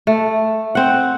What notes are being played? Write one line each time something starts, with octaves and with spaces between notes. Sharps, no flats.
A3
C4 F#5